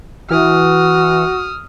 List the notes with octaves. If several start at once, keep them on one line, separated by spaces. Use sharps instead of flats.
E3 F#4 D#6 F6